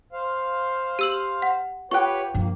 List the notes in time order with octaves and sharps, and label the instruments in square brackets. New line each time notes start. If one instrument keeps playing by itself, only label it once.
[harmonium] C5 F5
[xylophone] G4 E6 F#7
F#5
[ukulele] F4 F#5 G5 [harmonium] G4 B4 C#5 [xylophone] C#6 F#6
[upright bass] G2 F3 [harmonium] A#3